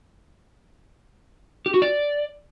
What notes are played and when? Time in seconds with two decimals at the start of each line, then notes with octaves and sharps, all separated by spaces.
1.66 G4
1.74 F#4
1.82 D5